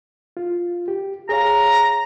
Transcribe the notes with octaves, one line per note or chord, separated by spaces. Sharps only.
F4
G4
G#4 C#5 F5 A#5